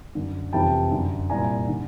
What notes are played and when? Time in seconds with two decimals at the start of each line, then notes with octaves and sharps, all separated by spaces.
0.15 F#2 D3
0.53 F2 C3 E3 G5 A5
0.91 F#2 D3
1.30 C2 A#2 G#5 A#5
1.68 D3